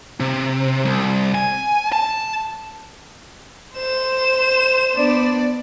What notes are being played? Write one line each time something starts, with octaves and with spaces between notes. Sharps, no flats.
C3
C2
G#5
A5
C5 E7
B3 D4 D5